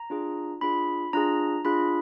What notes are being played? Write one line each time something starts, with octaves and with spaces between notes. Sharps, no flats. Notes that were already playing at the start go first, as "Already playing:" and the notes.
Already playing: A#5
D4 F4 G#4
D4 F4 G#4 B5
D4 F4 G#4 A#5
D4 F4 G#4 B5